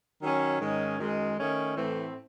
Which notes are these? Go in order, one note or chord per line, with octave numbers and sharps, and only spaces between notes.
D#3 F#3 C#4
G#2 D#3 G#3 C#4
F#2 D#3 G#3
D#3 A3 C#4
A2 E3 A3 C4